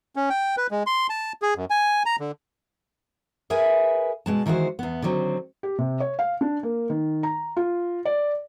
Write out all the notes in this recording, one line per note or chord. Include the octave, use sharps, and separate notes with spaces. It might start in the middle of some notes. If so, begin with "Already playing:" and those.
C#4
G5
B4
G#3
C6
A5
G#4
F#2
G#5
A#5
D3
G#4 A#4 B4 E5 G#5
B2 G#3 A5
D#3 E3 G#3 F#4 C5
E2 B3
D3 D#3 F#3 C4
G4
C3
C#5
F5
D4
A#3
D#3
A#5
F4
D5